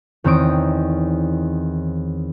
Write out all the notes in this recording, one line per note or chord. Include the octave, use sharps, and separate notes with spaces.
E2 D#3 C4 C#5 D#6 D7